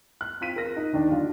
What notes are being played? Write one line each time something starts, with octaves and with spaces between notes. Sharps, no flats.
F#6
C4 F4 B6 D#7
A#4 A#6
D#4
D#2 D#3 D4
F#3 D4 F4